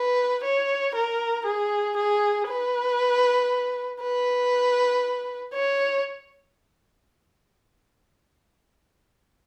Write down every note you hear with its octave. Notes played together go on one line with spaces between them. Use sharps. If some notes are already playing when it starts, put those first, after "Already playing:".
Already playing: B4
C#5
A#4
G#4
G#4
B4
B4
C#5